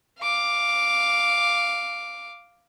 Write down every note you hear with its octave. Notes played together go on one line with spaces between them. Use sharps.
F5 D6